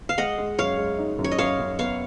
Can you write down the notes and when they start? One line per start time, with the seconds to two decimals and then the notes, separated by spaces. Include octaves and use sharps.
0.09 F5
0.18 G#3 D#5 F#5
0.38 G#3
0.59 F#2 C#5 F5
0.78 G#3
0.99 D#4
1.19 F#2
1.24 C#5
1.32 D#5
1.38 F#2 C#5 F5
1.59 F#2
1.79 B3 C#5 F5